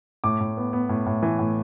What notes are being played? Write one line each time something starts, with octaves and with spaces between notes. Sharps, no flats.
A2 D6
A2
B3
B3
A2
A2
E3
A2